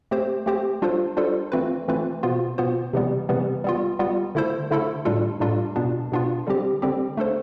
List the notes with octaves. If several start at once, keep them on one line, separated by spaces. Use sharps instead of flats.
A3 C4 G4 C5
A3 C4 G4 C5
G3 D4 F4 A4 C5
G3 D4 F4 A4 C5
E3 A3 C4 F4 B4
E3 A3 C4 F4 B4
B2 B3 F4 C5
B2 B3 F4 C5
C3 E3 G3 B3
C3 E3 G3 B3
G3 B3 F4
G3 B3 F4
D3 A3 E4 A4 C5
D3 A3 E4 A4 C5
A2 G3 D4 F4 A4
A2 G3 D4 F4 A4
B2 B3 D4 F4
B2 B3 D4 F4
D3 G3 C4 G4
D3 G3 C4 G4
A3 D4 A4 C5